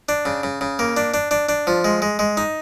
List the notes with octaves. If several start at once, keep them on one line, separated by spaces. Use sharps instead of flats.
D4
C#3
C#3
C#3
A#3
D4
D4
D4
D4
F3
G#3
G#3
G#3
D#4